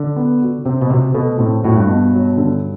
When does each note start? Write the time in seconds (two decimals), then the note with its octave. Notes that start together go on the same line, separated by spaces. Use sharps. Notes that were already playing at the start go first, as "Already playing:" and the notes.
Already playing: D3
0.16 B3
0.41 F#4
0.65 C3 C4
0.81 B2
0.90 C3 F#4
1.14 B2 A3
1.39 A2 C4
1.64 A2 F#4
1.77 G2
1.88 B2
2.13 F#3
2.37 D3